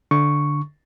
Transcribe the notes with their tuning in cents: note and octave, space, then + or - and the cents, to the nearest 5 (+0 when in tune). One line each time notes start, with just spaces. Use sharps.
D3 +0 C#6 +0